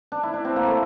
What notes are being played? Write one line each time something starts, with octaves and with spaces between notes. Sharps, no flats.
D4
E4
D4
C4
A#3
A3